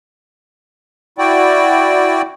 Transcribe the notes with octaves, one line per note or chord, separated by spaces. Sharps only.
E4 F#4 D5 G5